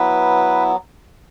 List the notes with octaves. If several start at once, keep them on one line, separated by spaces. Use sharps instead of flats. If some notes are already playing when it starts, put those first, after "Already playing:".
Already playing: F#3 B3 E4 B4